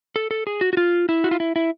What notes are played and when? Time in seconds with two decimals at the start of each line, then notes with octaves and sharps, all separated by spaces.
0.16 A4
0.31 A4
0.47 G#4
0.61 F#4
0.73 F#4
0.77 F4
1.09 E4
1.24 F#4
1.31 F4
1.40 E4
1.56 E4